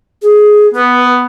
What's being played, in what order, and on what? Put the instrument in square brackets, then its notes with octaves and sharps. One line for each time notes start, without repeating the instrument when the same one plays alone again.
[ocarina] G#4
[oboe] B3 [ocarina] B4